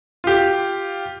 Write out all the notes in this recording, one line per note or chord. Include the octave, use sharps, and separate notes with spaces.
F4 G4